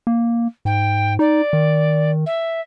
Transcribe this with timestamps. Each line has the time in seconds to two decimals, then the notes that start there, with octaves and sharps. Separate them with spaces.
0.07 A#3
0.65 G#2 G5
1.19 D#4 D5
1.53 D#3
2.26 E5